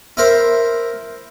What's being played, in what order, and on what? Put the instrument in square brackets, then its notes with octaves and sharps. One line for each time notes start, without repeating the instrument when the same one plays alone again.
[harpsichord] E4 A#4 C5